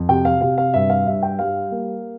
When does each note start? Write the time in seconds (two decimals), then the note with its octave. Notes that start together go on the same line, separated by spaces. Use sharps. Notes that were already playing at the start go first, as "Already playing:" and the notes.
Already playing: F2
0.09 C3 G5
0.25 F5
0.41 C3 F5
0.58 F5
0.74 G2 E5
0.90 F5
1.06 G2 E5
1.23 G5
1.39 G3 F5
1.71 A#3